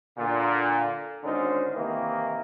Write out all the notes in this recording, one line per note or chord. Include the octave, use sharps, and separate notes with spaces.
A#2 D3
G#1 D3 C#4 D#4 A#4 C5
C3 D#3 E3 A#3